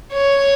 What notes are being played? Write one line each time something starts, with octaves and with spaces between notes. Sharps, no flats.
C#5